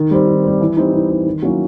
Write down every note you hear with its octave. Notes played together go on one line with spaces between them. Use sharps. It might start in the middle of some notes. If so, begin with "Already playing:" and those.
Already playing: D#3
G3 C4
D#3
G3 C4
E3
G3 C4 D#4
E3
G3 C4 D#4
D#3
F#3 A#3 C#4 E4